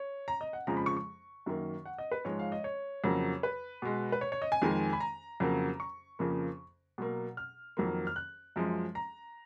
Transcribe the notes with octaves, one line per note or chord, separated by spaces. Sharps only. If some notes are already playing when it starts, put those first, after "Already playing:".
Already playing: C#5
A#5
D#5
F#5
F2 C#3 F3 G#3 A#5
B5
C#6
C#6
F#2 D#3 A#3
F#5
D#5
B4
G#2 F3 G#3 C#5
F5
D#5
C#5
F2 C#3 F#3 A#3
B4
B2 G#3
B4
C#5
C#5
D#5
G#5
F2 D#3 G#3
B5
A#5
F2 C#3 F#3 A#3
C#6
F2 C#3 F3 A#3
B2 F#3 A#3
F6
F2 D#3 F#3 A#3
F6
F#6
F#2 F3 G#3
A#5